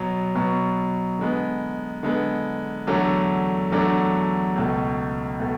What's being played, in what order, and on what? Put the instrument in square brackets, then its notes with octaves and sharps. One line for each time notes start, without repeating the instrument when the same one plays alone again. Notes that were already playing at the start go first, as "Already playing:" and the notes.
Already playing: [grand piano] B2 F#3 B3
B2 F#3 B3
D3 G#3 B3
D3 G#3 B3
E2 D3 F#3 A3 D4
E2 D3 F#3 A3 D4
C#2 B2 A3
B2 A3